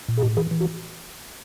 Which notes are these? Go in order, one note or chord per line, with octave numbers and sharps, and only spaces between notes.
A#2
G#4
A2 G4
E3 G#4
E3
F#4